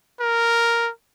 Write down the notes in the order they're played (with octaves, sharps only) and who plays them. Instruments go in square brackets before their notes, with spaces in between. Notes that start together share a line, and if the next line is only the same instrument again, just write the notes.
[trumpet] A#4